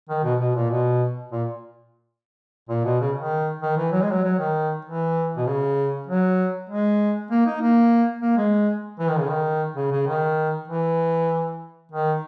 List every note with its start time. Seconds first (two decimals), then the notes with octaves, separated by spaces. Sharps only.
0.09 D#3
0.23 B2
0.40 B2
0.55 A#2
0.70 B2
1.32 A#2
2.69 A#2
2.85 B2
3.00 C#3
3.16 D#3
3.62 D#3
3.77 E3
3.92 F#3
4.03 G#3
4.12 F#3
4.24 F#3
4.38 D#3
4.85 E3
5.37 B2
5.46 C#3
6.07 F#3
6.69 G#3
7.31 A#3
7.46 D#4
7.61 A#3
8.22 A#3
8.37 G#3
8.99 E3
9.10 D#3
9.19 C#3
9.29 D#3
9.76 C#3
9.91 C#3
10.07 D#3
10.67 E3
11.91 D#3